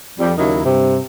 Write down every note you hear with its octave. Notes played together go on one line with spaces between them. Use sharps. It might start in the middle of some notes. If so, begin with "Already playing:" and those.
F2 G3
D#2 C#3 F#3 D#4 E4 A#4
G2 C3